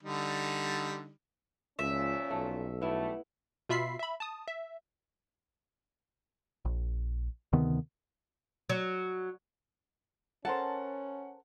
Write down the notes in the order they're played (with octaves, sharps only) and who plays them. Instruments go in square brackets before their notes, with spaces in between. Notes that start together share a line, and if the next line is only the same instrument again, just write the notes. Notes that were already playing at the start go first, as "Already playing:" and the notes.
[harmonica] D3 G3 D#4
[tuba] C#2 [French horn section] A#2 F3 C#4 [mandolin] E5
[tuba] B1 [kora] A3
[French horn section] G3 A3 [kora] B3 E4
[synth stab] B2 F4 E5 B5 B6 C7
E5 B5
A5 D#6
E5
[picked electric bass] A#1
D2 C3 D#3 B3
[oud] F#3
[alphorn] C#4 [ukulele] A4 A#4 C5 [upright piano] F#5 [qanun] A5